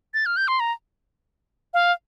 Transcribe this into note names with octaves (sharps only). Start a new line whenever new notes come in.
A6
F6
G6
C6
A#5
F5